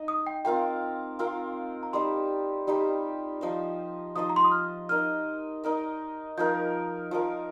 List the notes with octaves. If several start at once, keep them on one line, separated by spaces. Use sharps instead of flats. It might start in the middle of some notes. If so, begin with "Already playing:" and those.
Already playing: D#4 D#5
D#6
G5
C4 F4 A#4 F5 G5
C4 F4 A#4 F5
A#5
G3 D#4 G4 C5 C6
G3 D#4 G4 C5
F3 D#4 C5 D#5
F3 D#4 C5 D#5 D#6
A#5
C6
D#6
F6
D#4 A#4 D#5 F6
D#4 A#4 D#5
F3 D#4 A#4 G6
F3 D#4 A#4